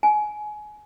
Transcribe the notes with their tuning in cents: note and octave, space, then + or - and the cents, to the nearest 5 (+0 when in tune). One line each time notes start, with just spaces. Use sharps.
G#5 +25